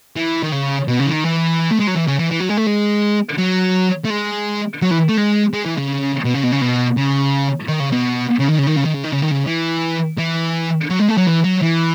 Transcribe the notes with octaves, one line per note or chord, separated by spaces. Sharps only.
E3
D#3
C#3
B2
C#3
E3
D#3
E3
A3
G#3
F#3
E3
C#3
E3
E3
F#3
G#3
A3
G#3
F#3
A3
G#3
F#3
E3
A3
G#3
G#3
E3
C#3
B2
C#3
B2
C#3
B2
C#3
D#3
C#3
B2
C#3
D#3
C#3
D#3
C#3
D#3
C#3
D#3
C#3
D#3
C#3
E3
E3
F#3
G#3
A3
F#3
E3
F#3
E3